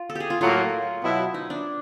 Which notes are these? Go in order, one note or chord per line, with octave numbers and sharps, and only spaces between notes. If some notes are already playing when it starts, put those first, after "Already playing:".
Already playing: F4
A4
G4 G#4
F4
A2 F#3 A#3 F4
B2 F#3 B3 E4
D#4
D4